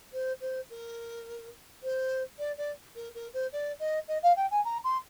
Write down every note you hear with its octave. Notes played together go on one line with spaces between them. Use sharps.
C5
C5
A#4
C5
D5
D5
A#4
A#4
C5
D5
D#5
D#5
F5
G5
G#5
A#5
C6